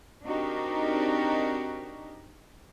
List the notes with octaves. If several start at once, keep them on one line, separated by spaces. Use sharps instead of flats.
C4 D4 D#4 F#4 G4 A#4